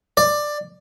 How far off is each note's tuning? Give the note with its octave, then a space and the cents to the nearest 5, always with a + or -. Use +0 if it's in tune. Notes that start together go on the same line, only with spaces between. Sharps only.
D5 +10